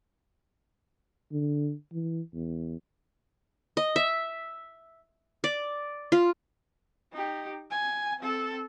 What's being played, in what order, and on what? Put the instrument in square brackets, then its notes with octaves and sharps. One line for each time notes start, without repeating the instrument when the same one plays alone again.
[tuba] D3
E3
E2
[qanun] D#5
E5
D5
F4
[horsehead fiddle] D#4 G4
G#5
C4 A4